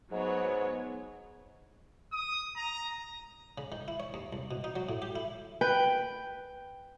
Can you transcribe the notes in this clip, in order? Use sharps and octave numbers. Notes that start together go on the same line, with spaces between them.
G#2 F#3 B3 C#5
D#6
A#5
C#3
D#3
E4
C#5
D#2
C2
B2
D#4
F#3
A2
G4
E4
B4 G5